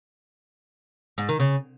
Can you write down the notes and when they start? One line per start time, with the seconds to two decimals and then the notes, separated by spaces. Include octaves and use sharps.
1.18 G#2
1.29 D#3
1.40 C#3